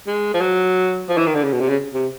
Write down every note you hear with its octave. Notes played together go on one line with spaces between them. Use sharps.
G#3
F3
F#3
F3
E3
D#3
D3
C#3
B2
C3
C#3
C3